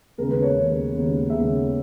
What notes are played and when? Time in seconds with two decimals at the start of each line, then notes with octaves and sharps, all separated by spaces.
0.18 D#2 C#3 G#3 B3 A#4
0.31 B4
0.42 C#5
0.55 D#2 C#3 G#3 B3
0.93 D#2 C#3 G#3 B3
1.30 D#2 C#3 G#3 B3 E5